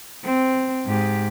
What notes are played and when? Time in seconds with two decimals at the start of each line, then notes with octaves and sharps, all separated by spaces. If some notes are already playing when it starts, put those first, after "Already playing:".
0.24 C4
0.86 G#2 G4